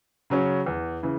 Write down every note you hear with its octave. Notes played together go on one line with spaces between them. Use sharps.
C#3 F#3 C#4
E2
C#3 E3